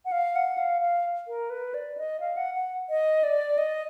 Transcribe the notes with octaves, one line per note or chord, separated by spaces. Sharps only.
F#5
F5
F#5
F5
F5
A#4
B4
D5
D#5
F5
F#5
F#5
D#5
D5
D#5